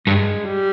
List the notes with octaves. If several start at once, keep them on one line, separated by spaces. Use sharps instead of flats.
G2 G#3
G3